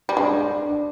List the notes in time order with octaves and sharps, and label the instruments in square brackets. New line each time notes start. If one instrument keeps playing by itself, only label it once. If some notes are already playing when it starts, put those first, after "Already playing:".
[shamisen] G3
[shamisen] G#3 [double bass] D4
[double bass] D4